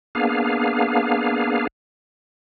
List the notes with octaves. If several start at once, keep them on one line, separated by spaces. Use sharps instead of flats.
A#3 B3 D4 G#4 F5